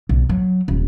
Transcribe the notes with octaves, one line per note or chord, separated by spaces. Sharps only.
B1
F#3
D#1